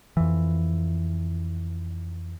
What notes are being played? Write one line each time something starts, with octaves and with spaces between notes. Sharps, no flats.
F2 E3